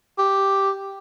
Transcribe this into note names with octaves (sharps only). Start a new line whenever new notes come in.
G4